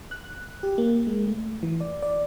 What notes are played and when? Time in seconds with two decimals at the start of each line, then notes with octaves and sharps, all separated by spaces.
0.11 F#6
0.63 G4
0.78 A#3
1.07 G#3
1.27 A3
1.63 E3
1.81 D5
2.02 D5